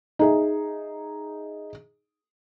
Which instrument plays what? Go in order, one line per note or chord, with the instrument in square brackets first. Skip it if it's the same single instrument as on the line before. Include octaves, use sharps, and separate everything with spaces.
[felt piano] D#4 G#4 E5